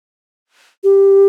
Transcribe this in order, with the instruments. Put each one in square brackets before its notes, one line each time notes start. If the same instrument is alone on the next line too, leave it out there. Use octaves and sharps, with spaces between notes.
[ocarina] G4